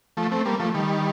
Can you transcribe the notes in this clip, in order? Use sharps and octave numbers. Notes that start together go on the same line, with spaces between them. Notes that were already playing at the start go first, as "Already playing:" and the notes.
F3 A3
A3 C4
G3 A#3
F3 A3
D#3 G3